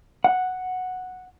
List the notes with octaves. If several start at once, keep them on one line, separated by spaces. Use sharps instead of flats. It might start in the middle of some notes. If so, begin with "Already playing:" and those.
F#5